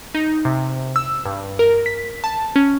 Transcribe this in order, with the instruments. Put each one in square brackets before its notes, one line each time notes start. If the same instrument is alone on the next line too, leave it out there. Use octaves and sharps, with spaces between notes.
[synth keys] D#4
C3
E6
G2
A#4
B6
A5
C#4